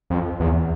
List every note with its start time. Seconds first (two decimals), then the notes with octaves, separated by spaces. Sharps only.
0.10 F2
0.40 E2